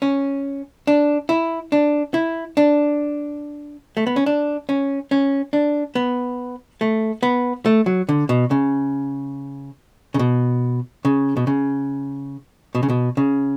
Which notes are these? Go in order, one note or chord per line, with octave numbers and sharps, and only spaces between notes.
C#4
D4
E4
D4
E4
D4
A3
B3
C#4
D4
C#4
C#4
D4
B3
A3
B3
A3
F#3
D3
B2
C#3
C#3
B2
C#3
B2
C#3
B2
C#3
B2
C#3